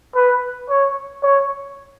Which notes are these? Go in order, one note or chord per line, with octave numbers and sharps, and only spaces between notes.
B4
C#5
C#5